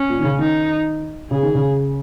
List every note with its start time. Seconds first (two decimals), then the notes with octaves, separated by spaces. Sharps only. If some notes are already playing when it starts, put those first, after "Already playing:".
Already playing: C#4
0.09 A#2
0.19 D#3
0.24 C#3
0.39 D#3 D#4
1.31 C#3 G#4
1.43 D#3
1.55 C#3